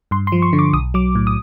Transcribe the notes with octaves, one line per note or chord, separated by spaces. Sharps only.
G2 C6
C6
F3
C#6
D3
D6
B1 D#6
F#3 D6
A2
D#6